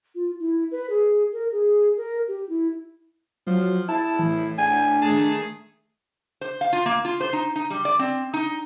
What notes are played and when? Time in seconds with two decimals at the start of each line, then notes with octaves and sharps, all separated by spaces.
0.15 F4
0.40 E4
0.72 B4
0.90 G#4
1.33 A#4
1.52 G#4
1.97 A#4
2.28 G4
2.49 E4
3.47 F3 F#3
3.89 E4 A5
4.19 A2 E3
4.58 D4 G#5
5.02 D#3 A3 G#4 A5
6.41 C5
6.61 F5
6.73 F4
6.86 A#3
7.05 F4
7.21 C5
7.33 D#4
7.56 D#4
7.70 G3
7.85 D5
7.99 C4
8.34 D#4